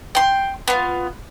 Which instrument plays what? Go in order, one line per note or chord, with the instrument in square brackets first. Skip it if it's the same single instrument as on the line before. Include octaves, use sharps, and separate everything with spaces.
[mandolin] G5 C6
B3 F4